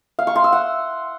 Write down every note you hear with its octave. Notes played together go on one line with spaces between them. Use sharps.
F5
C#6
C6
E6
F#5